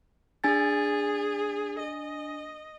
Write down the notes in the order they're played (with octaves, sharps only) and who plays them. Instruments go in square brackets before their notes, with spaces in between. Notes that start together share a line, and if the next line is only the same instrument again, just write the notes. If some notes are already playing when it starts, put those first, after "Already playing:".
[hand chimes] D4 G#5 A6 [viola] G#4
[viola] D#5